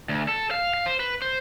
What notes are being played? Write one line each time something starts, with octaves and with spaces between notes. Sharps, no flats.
D2
A4
F5
F5
C5
B4
C5